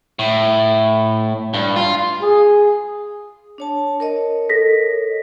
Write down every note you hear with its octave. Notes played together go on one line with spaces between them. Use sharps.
A2
G2
F4
G#4
D4 C#5 A5
A#4 C#5 D#5
A4 A#6 B6